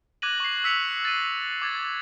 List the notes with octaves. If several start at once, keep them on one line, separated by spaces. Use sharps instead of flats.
D6 F#6 G#6 A#6 D#7 F#7
C#6 C7
E6 B6 C#7 F7
A6 D#7
D6 G#6 A6